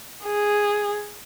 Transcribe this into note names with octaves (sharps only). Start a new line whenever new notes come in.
G#4